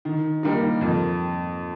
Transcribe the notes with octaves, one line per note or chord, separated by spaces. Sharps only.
D#3
G3 A#3 D#4
F2